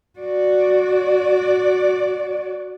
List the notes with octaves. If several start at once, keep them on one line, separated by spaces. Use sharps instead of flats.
F#4 D5